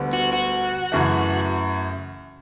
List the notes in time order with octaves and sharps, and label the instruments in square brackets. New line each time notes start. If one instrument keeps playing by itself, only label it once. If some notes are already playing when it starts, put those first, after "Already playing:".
Already playing: [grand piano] D2 D3 G3 B3
[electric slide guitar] F#4
F#4
[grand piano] F#2 C#3 E3 A3